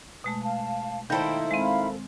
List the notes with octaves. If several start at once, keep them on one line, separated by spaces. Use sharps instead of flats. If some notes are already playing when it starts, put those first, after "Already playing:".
B2 G#3 A3
F5 A5
D#3 A#3 D#4 E4 A4 C5 G5 B5
G#3 C4 F5 B5